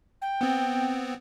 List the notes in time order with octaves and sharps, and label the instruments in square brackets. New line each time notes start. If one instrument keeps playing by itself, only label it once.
[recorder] G5
[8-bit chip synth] B3 C4